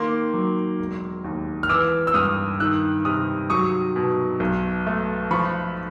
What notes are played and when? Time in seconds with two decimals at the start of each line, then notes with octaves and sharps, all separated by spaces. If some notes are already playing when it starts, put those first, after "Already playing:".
Already playing: D#3 A#3 C6 D6
0.34 F#3
0.79 E1
1.24 D#2
1.63 F6
1.69 E3 D6 E6
2.07 E6
2.14 G2 D#6 F6
2.60 D#3 E6 F#6
3.05 C3 D#6 F6
3.50 F#3 C#6 D#6
3.96 B2
4.40 B1
4.86 A3
5.31 F3 B5 C#6